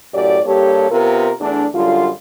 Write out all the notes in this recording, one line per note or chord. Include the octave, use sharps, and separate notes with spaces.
F#2 A2 G4 D5
G2 A#3 G4 A4 C#5
C3 B3 F4 A#4
E2 A3 D4
F#2 D3 G3 F4